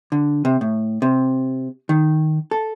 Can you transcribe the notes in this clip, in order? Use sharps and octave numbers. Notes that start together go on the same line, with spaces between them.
D3
C3
A2
C3
D#3
A4